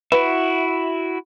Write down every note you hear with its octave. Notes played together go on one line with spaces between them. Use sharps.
E4 F#4 B4 E5